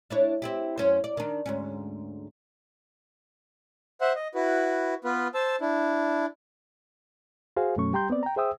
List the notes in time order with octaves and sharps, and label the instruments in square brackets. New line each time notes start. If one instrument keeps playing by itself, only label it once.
[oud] D4 E4 C#5
C4 E4 G4
F#2 C#4 C5
D5
D#3 D4
D2 G#2 C#4
[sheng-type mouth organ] C5 E5 F#5
D#5
E4 F#4 B4
B3 F4 B4
C5 A5 E6
D4 E4
[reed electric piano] F#4 G#4 C5 F5 G#5
F#2 B2 F#3 A3 C#4 C#6
G3 G4 G5 A#5 C6 G6
B3 C4 D5
G5 A#5
G#4 C5 E5 G5 D#6 E6